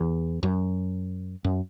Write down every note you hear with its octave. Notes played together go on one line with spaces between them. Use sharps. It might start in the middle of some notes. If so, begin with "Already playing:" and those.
Already playing: E2
F#2
F#2